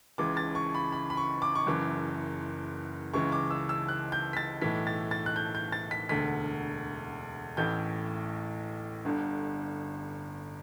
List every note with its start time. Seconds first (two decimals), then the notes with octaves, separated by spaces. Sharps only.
0.18 C#2 C#3 E3 D6
0.37 A6
0.55 C#6
0.75 B5
0.92 B5
1.10 B5
1.17 C#6
1.42 D6
1.55 C#6
1.66 F#1 F#2 E3 D6
3.13 C#2 C#3 E3 C#6
3.32 D6
3.51 E6
3.69 E6
3.89 F#6
4.12 G6
4.33 B6
4.37 A6
4.62 B1 A2 E3 B6
4.87 A6
5.11 A6
5.26 F#6
5.36 G6
5.55 G6
5.72 A6
5.91 B6
6.09 E1 D2 D3 B6
7.57 A1 A2 E3 G6
9.05 G1 G2 D3